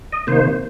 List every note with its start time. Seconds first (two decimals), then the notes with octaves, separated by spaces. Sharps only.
0.12 D#5
0.27 C3 D#3 A#3 C5